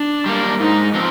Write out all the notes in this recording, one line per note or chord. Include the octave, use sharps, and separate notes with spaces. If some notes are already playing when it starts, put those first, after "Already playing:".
Already playing: D4
G3 A#3
G#2 D#4
F3 C4 D#4